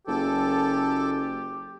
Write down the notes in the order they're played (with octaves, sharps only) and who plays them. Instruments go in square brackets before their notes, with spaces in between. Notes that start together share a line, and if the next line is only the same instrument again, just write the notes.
[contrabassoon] F#1 [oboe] G4 [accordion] A4